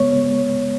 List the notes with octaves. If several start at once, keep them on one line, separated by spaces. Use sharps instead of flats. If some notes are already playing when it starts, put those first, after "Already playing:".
Already playing: C#3 G#3 B3 C#5